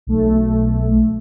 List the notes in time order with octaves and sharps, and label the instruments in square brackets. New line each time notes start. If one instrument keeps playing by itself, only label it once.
[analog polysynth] B1 A3